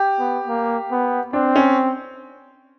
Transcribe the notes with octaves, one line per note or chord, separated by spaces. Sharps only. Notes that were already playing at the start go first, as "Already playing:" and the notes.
Already playing: G4
B3
A#3
B3
C4 D4
C#4